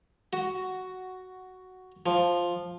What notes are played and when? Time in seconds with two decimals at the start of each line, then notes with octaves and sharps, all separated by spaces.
0.33 F#4
2.06 F3